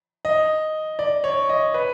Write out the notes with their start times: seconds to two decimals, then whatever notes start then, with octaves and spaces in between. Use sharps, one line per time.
0.25 D#5
0.99 D5
1.24 C#5
1.49 D#5
1.74 B4